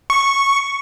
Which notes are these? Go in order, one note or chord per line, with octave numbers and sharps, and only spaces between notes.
C#6